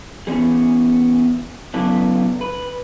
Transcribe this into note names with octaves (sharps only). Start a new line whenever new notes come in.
E3 B3 C#4 G#4
C#3 F#3 A3 B3 D4 E4
B4